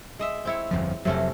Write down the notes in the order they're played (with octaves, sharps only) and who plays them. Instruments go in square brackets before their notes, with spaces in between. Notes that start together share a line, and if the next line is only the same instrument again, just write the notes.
[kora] G#3 D#5 E5
C4 E4 C#5
[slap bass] G1 F2 F3
[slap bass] F1 F2 F#3 [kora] C3 A3 C#4